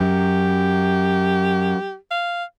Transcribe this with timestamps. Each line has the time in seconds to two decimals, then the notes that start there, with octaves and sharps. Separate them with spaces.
0.01 F#2 G4
2.11 F5